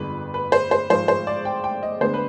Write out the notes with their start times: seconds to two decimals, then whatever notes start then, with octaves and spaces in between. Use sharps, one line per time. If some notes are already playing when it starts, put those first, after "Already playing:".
Already playing: G1 F2 D3 G#3 B4
0.34 B4
0.52 C5
0.71 C5
0.90 G#1 G#2 F3 C5
1.08 C5
1.27 D5
1.45 G5
1.64 G5
1.83 D#5
2.01 D2 D3 G#3 B3 D4 C5
2.14 B4